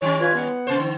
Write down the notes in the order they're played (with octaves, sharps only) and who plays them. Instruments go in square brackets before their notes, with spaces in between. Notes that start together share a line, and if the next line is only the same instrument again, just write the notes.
[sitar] D#3 G3 C#4 [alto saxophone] C#5
[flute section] F4 B4 G#6
[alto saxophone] B3 [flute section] F#5
[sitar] C3 C5
D3